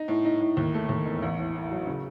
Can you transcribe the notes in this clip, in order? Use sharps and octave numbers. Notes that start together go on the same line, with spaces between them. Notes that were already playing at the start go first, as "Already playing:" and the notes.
Already playing: D#4
A2
D#4
A2
D#2
A3
D#2
E1
A1
A2
A2
F#3
C#3